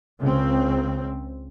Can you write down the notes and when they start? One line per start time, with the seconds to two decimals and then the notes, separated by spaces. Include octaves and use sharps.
0.20 C#2 C#3 C4